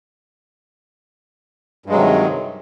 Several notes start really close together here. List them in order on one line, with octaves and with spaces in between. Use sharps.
G2 G#3 F#3 C3 D#3